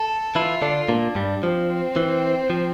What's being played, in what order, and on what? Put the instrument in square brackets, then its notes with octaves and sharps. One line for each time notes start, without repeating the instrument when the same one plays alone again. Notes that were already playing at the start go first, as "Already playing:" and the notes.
Already playing: [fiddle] A4
[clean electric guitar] E3 E4 [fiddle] F4
[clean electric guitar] D3 D4
[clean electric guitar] A#2 A#3 [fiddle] D4
[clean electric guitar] G2 G3
[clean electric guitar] F3 [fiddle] C4
[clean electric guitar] E3
F3